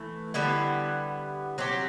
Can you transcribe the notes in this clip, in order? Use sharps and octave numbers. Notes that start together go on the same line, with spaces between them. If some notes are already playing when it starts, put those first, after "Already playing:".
Already playing: E3 A3 E4
D3 G3 B3 E4
F#3 C4 G4